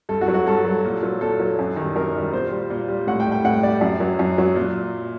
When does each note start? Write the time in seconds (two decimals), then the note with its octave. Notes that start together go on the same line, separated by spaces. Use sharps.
0.09 G2 A4
0.21 F#4
0.28 F#3
0.34 F#4
0.46 G2 A4
0.65 F#3
0.84 A#2
1.03 F#3
1.21 A#2 A4
1.40 F#3
1.59 F#2
1.76 D#3 G3
1.96 F#2 A#4
2.15 D#3 G3
2.32 A#2 C5
2.52 G3
2.70 A#2
2.88 G3
3.07 A2 F#5
3.20 G5
3.26 G3
3.32 G5
3.45 A2 F#5
3.63 G3 D5
3.81 F#2
4.00 F#3
4.19 F#2
4.38 F#3
4.55 A#2